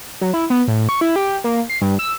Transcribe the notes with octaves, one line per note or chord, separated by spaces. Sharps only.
F#3
E4
B3
A2
C#6
E4
G4
A#3
C7
G2
E6